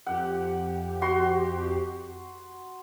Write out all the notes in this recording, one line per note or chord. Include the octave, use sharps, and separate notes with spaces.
F2 G4 F#5
F#4 C6